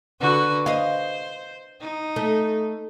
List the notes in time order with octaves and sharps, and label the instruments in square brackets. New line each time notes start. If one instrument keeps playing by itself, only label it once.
[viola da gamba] D3 F#4 B4
[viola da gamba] C5 [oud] D#5 F5
[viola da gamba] D#4
[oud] A3